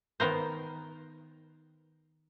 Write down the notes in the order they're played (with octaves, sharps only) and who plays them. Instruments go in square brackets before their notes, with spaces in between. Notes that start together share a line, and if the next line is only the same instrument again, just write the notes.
[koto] D#3 B3 A#4 C5